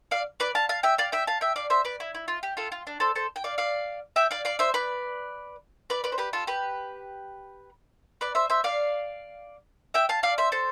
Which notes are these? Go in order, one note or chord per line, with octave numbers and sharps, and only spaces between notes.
D5 F5
B4 D5
F5 A5
F5 A5
E5 G5
D5 F5
E5 G5
F5 A5
E5 G5
D5 F5
C5 E5
B4 D5
E4
E4
F4
G4
F4 A4
F4
D4
A4 C5
A4 C5
G5
D5 F5
D5 F5
E5 G5
D5 F5
D5 F5
C5 E5
B4 D5
B4 D5
B4 D5
C5
G4 B4
F4 A4
G4 B4
B4 D5
C5 E5
C5 E5
D5 F5
E5 G5
F5 A5
D5 F5
C5 E5
A4 C5